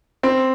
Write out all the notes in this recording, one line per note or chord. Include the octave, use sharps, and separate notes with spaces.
C4